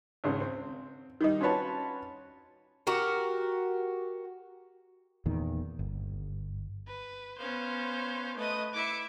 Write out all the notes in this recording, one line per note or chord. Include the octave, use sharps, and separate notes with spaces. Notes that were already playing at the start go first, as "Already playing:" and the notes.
G#1 C#2 C#3 C#4
C4
D#3 G3 D#4
C#4 F4 F#4 B4 C#5 A5
F#4 G4 A#4
E2 A#2 D#3
G1
B4
B3 C#4 C5 F5
A3 B4 D#5 D#6
E4 E5 D6 C#7